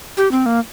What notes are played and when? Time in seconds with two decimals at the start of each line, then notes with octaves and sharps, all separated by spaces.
0.17 G4
0.31 C4
0.46 A#3